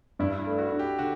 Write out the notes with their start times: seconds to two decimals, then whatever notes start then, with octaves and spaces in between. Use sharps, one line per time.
0.19 G2 E4
0.39 E4
0.46 A3
0.58 F#4
0.72 D4
0.79 G4
0.99 D3 F#4